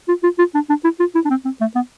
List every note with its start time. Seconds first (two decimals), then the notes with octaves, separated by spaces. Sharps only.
0.08 F4
0.23 F4
0.39 F4
0.54 D4
0.69 D4
0.84 E4
1.00 F4
1.15 E4
1.25 D4
1.30 C4
1.45 C4
1.61 A3
1.75 B3